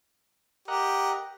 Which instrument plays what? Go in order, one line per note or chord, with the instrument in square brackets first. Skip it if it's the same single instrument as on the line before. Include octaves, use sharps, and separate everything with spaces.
[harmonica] G4 [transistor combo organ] A#4 D#5 F#5